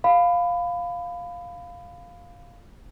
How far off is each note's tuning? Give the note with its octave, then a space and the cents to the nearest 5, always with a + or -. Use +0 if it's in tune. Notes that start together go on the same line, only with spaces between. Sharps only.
F5 +5 B5 +20